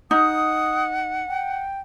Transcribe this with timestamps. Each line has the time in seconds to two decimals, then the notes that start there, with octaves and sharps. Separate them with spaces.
0.11 D#4 F#5 D#6
1.29 G5